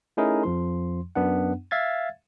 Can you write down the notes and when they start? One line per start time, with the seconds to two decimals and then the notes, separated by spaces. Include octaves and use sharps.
0.17 A3 C#4 D#4 E4 G#4 A#4
0.43 F2 F3 C6
1.15 F#2 B3 D4 F#5
1.71 E5 F5 G#6 A6